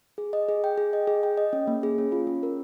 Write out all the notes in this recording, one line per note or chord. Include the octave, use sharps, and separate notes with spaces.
G#4
D#5
G#4
G5
G#4
D#5
G#4
G5
D#5
C#4
A#3
G#4
C#4
F4
C#4
A#4